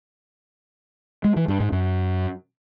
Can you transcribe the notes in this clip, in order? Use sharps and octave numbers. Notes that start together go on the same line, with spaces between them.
G#3
E3
G2
G#2
F#2